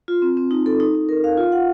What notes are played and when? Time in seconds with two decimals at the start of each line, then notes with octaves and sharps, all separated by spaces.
0.08 F4
0.22 C4
0.37 C4
0.51 D#4
0.66 A4
0.80 D#4
0.95 D#4
1.09 A#4
1.24 F5
1.37 F4
1.52 F#5